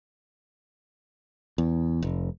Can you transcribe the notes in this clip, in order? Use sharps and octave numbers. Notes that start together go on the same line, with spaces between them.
E2
F1